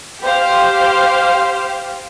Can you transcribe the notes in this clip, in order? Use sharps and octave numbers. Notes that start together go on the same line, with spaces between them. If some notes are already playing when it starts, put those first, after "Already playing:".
G4 C5 F5